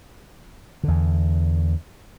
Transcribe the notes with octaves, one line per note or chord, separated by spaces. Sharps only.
E2 D3